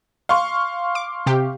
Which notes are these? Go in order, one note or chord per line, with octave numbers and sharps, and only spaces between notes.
F5 C6 C#6
D6
C3 G4